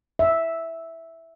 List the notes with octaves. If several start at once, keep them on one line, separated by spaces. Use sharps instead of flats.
E5